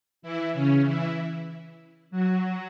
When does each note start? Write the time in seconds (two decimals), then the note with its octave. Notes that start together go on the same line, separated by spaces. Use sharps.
0.22 E3 E4
0.53 C#3 C#4
0.86 E3 E4
2.11 F#3 F#4